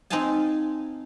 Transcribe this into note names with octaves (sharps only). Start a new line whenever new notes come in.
C4 D#4 F4 F5 G#5 A5